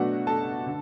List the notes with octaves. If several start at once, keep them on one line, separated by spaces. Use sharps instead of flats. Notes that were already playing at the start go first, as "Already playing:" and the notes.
Already playing: B2 F#3 A3 D4 F#4 F#5
A4 A5
D3